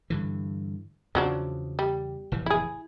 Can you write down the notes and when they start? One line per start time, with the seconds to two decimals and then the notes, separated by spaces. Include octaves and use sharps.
0.10 G2 D3 E3
1.15 E2 C#3 F3 F#3 D4
1.79 G3
2.32 F1 A2 E3
2.46 E4 G#4